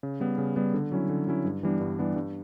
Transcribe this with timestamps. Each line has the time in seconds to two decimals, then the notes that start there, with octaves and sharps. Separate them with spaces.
0.03 C#3
0.20 G3 B3
0.38 C#3
0.56 G3 B3
0.74 D3
0.92 F#3 C#4 E4
1.09 D3
1.27 F#3 C#4 E4
1.44 G2
1.63 E3 G3 B3 D4
1.80 G2
1.99 E3 G3 B3 D4
2.16 G2